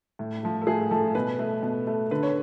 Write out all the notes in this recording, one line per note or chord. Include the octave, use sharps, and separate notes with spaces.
A2
F3 A3
A4
A2 G#4
F3 A3 A4
B2 B4
A3
B2
A3
D3 B4
C#5